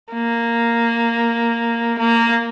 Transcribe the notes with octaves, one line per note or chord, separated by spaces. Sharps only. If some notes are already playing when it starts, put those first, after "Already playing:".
A#3
A#3